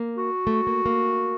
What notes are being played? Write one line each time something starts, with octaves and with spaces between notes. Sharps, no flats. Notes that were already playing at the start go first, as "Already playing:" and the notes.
Already playing: A#3
F#4
A3
A#3
A#3